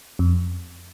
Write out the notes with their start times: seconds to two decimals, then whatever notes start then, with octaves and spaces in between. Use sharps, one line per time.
0.19 F2